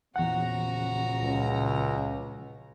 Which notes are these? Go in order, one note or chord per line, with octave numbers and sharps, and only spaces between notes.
A#1 E2 C#3 F#4 F#5 A#5
C#2